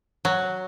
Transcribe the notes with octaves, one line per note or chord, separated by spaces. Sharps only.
F#3